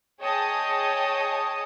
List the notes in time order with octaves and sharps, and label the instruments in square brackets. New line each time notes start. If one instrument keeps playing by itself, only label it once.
[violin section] G#4 C#5 D#5 G5 A5 D#6